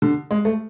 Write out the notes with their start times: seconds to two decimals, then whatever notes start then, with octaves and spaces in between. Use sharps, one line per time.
0.02 D3
0.31 G#3
0.45 A3